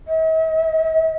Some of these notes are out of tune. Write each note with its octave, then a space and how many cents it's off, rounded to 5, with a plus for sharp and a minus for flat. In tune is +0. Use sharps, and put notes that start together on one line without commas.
E5 -45